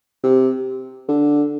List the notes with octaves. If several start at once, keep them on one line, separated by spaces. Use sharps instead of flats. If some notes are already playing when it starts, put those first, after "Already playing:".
C3
D3